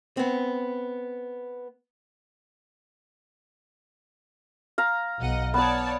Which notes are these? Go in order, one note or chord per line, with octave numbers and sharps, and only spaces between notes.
B3 C4
F5 A#5
B1 D#5 F#5
B3 C#5 D5 A5 D#6